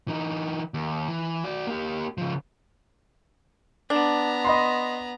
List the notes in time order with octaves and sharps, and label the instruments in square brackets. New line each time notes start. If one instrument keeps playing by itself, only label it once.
[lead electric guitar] E3 D#4
D#2
E3
F#4 D5
A#3 G4
C#3 F3
[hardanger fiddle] B3 A#5 [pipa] D4
[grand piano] D#5 B5 C6